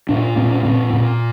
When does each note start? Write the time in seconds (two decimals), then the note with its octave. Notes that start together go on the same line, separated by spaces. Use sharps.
0.09 A#2 D4
0.37 A#2 C4
0.51 C#4
0.65 A#2 C4
0.93 A#2